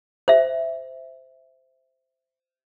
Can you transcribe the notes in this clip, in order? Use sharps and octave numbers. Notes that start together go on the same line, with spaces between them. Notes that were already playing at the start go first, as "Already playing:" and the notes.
C5 E5